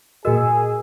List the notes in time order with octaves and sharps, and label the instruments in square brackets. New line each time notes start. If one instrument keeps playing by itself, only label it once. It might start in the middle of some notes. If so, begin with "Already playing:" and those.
[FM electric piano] A#2 E6 [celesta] F#4 A#4 D#5 [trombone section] G#4